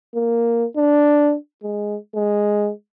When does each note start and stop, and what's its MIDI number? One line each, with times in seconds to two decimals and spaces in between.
0.15 0.65 58
0.77 1.35 62
1.63 1.97 56
2.15 2.71 56